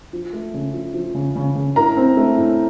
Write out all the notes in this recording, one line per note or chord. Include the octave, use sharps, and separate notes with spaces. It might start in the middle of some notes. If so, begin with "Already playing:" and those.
F3
A3
C#3
F3
F3
C#3
C#3
C#3
A2 A#4 A#5
C4
A3
A2